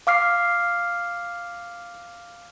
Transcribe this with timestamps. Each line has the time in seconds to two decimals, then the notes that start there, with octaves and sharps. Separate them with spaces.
0.07 F5 D6 F6 C7